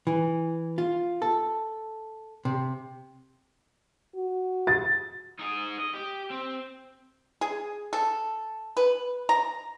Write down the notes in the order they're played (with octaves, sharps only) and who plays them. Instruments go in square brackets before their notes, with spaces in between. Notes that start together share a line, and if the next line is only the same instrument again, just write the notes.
[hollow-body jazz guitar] E3
F4
A4
C3
[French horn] F#4
[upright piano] A6
[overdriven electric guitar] D#4 G#4
D#5
G4
C4
[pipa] G#4
A4
B4
A#5